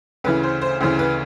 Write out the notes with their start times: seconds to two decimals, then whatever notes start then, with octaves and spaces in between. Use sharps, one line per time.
0.24 D2 C#3 E3 B4
0.43 C5
0.61 C5
0.81 D2 C#3 E3 C5
0.99 B4